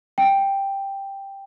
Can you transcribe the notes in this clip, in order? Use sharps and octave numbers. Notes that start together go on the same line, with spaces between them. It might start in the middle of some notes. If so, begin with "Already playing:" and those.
G5